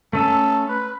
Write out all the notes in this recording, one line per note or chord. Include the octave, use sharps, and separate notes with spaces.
A3 C#4 A4 E6
B4